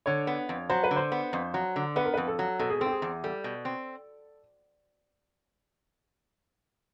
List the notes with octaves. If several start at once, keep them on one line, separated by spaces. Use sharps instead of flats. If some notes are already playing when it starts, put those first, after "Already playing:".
D3 C#5
B3
F2
F#3 C5
B4
D3
C5
B3
F2
F#3
D3
B3 B4
A#4
F2 B4
A4
F#3
B2 A4
G#4
C4 A4
G4
G#4
E2
G3 A4
B2
C4